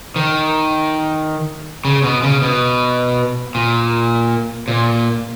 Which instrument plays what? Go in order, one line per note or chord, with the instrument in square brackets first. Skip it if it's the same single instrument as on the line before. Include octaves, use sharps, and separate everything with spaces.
[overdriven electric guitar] D#3
C#3
B2
C#3
B2
A#2
A#2